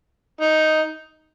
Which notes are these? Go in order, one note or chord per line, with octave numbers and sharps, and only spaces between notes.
D#4